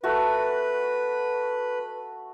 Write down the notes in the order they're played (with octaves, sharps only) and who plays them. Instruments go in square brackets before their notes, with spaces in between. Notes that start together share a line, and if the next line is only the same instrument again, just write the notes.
[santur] A3 F#4 [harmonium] B4